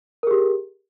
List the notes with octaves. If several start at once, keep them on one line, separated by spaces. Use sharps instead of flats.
G4 G#4 A#4